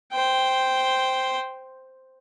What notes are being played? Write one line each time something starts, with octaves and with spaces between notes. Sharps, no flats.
C5 G5